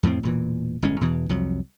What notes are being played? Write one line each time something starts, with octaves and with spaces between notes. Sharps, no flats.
F2 A2 F3 C4
E1 A#2 E3
G1 A2 G#3 C#4
E2 B2 E3
C2 F2 F#3